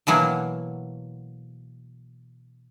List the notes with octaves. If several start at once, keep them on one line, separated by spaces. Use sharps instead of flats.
B2 E3 F#3 A#3